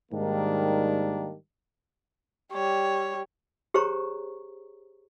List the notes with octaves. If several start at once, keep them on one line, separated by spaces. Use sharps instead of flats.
G#2 D#3 G3 A#3 D4
G3 C#5
G4 G#4 C5 C#5 A#5 C#6